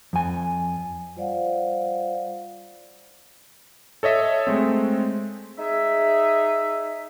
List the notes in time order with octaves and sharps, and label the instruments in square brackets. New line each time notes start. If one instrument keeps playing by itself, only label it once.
[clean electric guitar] F2 G#5
[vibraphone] G3 F4 C5 D5 F5 F#5
[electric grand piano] A4 C#5 D#5 E5
G#3 A3 C4
[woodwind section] D#4 G#4 E5